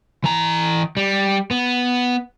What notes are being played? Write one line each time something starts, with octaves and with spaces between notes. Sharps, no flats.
E3 A#5
G3
B3